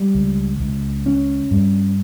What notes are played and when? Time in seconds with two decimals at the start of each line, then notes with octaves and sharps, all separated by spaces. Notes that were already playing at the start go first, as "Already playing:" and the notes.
Already playing: G3
0.15 C#2
0.60 C#2
1.06 C#4
1.51 G2